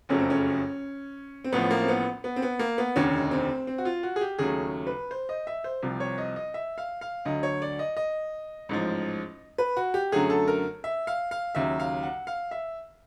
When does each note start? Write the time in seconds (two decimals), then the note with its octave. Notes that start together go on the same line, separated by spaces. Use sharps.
0.09 F#1 F2 C#3 F#3 A3 C#4
0.19 C4
0.30 C#4
1.44 C4
1.52 A1 A2 F3 B3
1.71 A#3
1.82 C4
1.88 B3
2.24 B3
2.36 C4
2.42 B3
2.59 A#3
2.78 B3
2.96 F1 D#2 D3 C#4
3.31 C4
3.67 C4
3.78 F#4
3.85 F4
4.03 F#4
4.16 G#4
4.21 G4
4.38 D#2 C#3 F#3 A3 G#4
4.87 B4
5.11 C5
5.29 D#5
5.47 E5
5.64 C5
5.83 C2 C3 F3
6.00 C#5
6.18 D#5
6.36 D#5
6.54 E5
6.78 F5
7.01 F5
7.25 D2 D3 F#3 D#5
7.43 C#5
7.62 D5
7.79 D#5
7.97 D#5
8.69 A1 G#2 F3
9.58 B4
9.77 F#4
9.94 G4
10.12 F#2 D3 F#3 A3 G#4
10.30 A4
10.48 A#4
10.84 E5
11.07 F5
11.31 F5
11.55 D#2 C#3 F#3 E5
11.80 F5
12.03 F#5
12.27 F5
12.51 E5